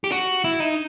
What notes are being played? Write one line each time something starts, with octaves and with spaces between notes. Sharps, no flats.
G4
F#4
E4
D#4